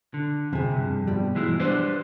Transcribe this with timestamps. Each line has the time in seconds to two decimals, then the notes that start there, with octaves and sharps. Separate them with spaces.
0.14 D3
0.53 F2 C3 G#4
0.76 G2
1.07 B2 F3 G3
1.35 E3 G#3 E4
1.60 D4 B4 C5